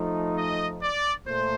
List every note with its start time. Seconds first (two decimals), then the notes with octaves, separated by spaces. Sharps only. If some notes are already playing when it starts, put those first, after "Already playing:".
Already playing: F3 A3 D#4
0.36 D#5
0.81 D5
1.26 A#2 A3 C5